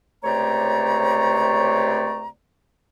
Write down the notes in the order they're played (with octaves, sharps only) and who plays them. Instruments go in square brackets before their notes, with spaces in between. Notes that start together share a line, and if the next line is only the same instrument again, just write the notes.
[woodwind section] C#2 C3 A3 C#5 D5 A#5